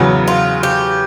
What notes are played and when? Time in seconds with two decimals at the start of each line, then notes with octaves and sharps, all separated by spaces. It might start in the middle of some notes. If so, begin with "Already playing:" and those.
Already playing: E2 C#3 F#3 B3
0.28 F4
0.63 G4